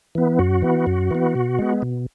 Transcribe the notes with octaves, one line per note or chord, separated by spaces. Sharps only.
E3 B3
F#2 F#4
E3 B3
F#2
E3 B3
B2
G#3 B3
B2